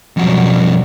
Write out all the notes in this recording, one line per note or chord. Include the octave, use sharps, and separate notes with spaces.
F2 B2 F#3 G3 F#4